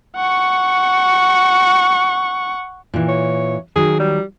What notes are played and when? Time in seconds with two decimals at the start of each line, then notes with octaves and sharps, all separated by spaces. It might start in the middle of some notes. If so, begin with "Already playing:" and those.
0.16 F#5 C#6
2.94 A#2 E3
3.08 C#5
3.76 D#3 F#3 G#4
3.99 G3